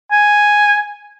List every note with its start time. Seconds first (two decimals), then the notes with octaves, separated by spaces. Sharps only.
0.11 G#5